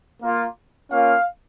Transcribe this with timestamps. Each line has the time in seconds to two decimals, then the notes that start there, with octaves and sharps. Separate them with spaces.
0.21 A#3 F4
0.91 A#3 C#4 F4 F5